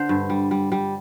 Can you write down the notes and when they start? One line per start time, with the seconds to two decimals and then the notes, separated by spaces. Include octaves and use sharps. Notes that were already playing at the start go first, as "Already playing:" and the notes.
Already playing: D3 C5
0.09 G2
0.30 G3
0.51 G3
0.72 G3